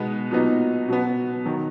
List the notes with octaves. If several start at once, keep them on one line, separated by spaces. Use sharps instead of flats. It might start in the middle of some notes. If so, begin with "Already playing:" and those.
Already playing: B2 G#3 B3 D#4
A#2 F#3 B3 D#4
B2 F#3 B3
D#3 F#3